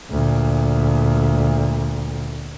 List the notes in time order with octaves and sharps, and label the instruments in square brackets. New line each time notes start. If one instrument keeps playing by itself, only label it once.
[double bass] D2 A#2